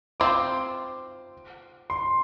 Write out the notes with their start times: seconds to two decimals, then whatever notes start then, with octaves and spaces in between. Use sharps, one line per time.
0.20 C4 F4 C5 D6
1.90 C6